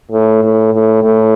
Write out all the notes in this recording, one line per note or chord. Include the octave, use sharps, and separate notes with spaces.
A2
A2
A2
A2